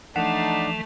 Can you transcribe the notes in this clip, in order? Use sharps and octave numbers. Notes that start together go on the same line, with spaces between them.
E3 F3 A3 D4 D#4 D5 F#5